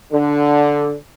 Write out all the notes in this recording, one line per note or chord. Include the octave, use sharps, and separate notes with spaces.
D3